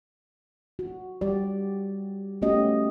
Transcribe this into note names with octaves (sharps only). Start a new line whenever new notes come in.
F#4
G3 G4 D5
A3 B3 C#4 F#4 G4 D#5